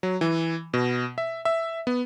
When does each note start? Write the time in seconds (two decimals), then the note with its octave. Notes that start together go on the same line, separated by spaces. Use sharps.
0.03 F#3
0.21 E3
0.74 B2
1.18 E5
1.45 E5
1.87 B3